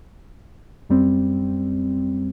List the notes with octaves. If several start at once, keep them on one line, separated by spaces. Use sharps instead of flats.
F#2 G3 C4